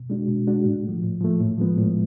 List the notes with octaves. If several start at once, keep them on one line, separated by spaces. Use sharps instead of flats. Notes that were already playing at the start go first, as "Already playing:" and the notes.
Already playing: B2
G#3 D4 F#4
B2
G#3 D4 F#4
A2
F3 A3
A2
F3 A3
A2
F3 G#3 B3
A2